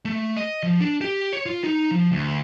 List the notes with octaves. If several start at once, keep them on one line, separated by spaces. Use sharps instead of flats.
A3
D#5
F3
D4
G4
C#5
F4
D#4
F3
D2